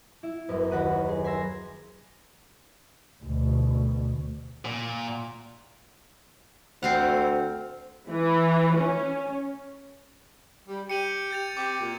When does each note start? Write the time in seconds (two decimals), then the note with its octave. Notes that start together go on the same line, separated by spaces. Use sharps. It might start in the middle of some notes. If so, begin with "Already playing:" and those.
0.23 E4
0.49 F#1 F#2 B3
0.71 D#2 F#4 F#5 B5 D#7
1.08 G#4
1.24 G#5 B5 C6 E6 A#6
3.25 D2 B2
4.65 A#2
6.83 D2 C4 F5 F#5
8.08 E3
8.75 C#4
10.67 G3
10.90 G4 C#7 D#7 F#7
11.31 G6 A6 F7
11.57 C4 G4 D6
11.80 A#2